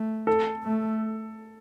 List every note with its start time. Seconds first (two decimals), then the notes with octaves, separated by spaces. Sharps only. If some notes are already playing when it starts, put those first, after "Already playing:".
Already playing: A3
0.27 A4
0.63 A3